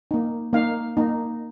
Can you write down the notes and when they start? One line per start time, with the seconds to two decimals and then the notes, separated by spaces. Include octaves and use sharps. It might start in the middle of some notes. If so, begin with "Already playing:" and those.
0.11 A#3 D#4
0.53 A#3 D#4 F5
0.97 A#3 D#4